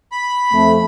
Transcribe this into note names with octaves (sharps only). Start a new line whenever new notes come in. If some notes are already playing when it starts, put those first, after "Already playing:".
B5
F2 A3